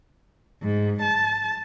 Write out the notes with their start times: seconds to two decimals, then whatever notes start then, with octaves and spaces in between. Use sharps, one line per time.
0.63 G#2
1.01 A5